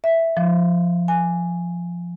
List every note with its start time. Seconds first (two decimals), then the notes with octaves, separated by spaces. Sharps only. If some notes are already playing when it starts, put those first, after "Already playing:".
0.04 E5
0.37 F3
1.08 G#5